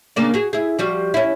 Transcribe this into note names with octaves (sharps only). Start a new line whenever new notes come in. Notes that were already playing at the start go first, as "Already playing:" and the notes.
C#3 A#3 D4
F#4 G#4
E4 G#4
F3 G3 F#4
C#4 E4